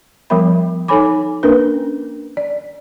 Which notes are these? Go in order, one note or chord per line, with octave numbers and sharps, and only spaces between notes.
F3 G3 B3 A#4 E5 B5
D#4 A4 C#5 G#5 B5 D6
A#3 C#4 D4 A#4 B4
D5